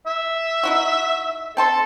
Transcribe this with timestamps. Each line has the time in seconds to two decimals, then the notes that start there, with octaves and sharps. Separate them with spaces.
0.07 E5
0.63 D#4 E4 F#4
1.57 C4 A4 A5 C6